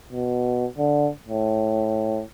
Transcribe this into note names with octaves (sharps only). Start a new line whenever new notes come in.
B2
D3
A2